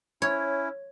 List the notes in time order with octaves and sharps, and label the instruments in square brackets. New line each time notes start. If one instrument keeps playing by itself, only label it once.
[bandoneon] C#4 E4 [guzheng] C#5